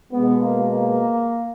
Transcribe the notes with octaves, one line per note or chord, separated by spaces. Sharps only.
B2 G#3 B3
A#3
A#3